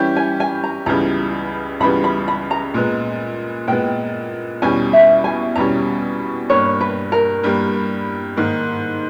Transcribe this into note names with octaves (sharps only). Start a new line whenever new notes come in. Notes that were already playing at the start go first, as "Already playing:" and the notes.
Already playing: E3 G3 C#4 G4
G#5
G#5
A#5
C#2 C#3 E3 G3 B3 A#5
C#2 C#3 E3 G3 B3 B5
B5
B5
A#5
A#2 G#3 B3
A#2 G#3 B3 G5
E2 B2 G3 C#4 G#5
E5
G#5
E2 B2 G3 C#4 A#5
G2 G3 A#3 C#5
B4
A#4
G2 G3 A#3
G#2 D#3 A#3